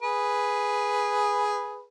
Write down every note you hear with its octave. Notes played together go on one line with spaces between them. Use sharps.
G#4 B4